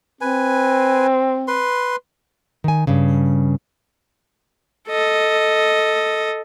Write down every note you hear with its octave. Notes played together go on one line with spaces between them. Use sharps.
C4 B4 G#5
B4 C6
D#3 G#5
G2 C#3
A4 D#5